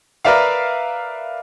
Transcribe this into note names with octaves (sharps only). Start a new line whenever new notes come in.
A#4 B4 D5 E5 F5